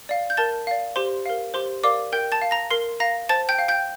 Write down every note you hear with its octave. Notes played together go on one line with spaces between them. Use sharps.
D5 F5
G6
A#4 A5 A6
D5 F5
G4 C5 C6
A#4 F5
G4 C5 C6
A#4 D5 F5 D6
A#4 G5 G6
A5 A6
F5
A#5 A#6
A#4 C6 C7
F5 A#5 A#6
C5 A5 A6
G5 G6
F5
G5 G6